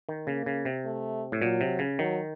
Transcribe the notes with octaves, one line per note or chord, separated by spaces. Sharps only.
D#3
C#3 A#3
C#3
C3
A3
A2
A#2 F#3
C3
C#3
D#3 F#3